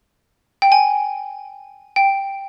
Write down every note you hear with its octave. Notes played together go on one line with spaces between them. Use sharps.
G5
G#5
G5